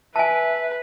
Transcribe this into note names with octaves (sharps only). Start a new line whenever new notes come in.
B4 E5 G#5 A5